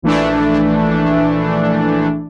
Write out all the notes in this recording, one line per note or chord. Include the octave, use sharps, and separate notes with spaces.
A#1 E3 A3 D4